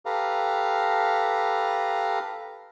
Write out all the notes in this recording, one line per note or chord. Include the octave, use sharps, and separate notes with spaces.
G4 A4 B4 F5 A#5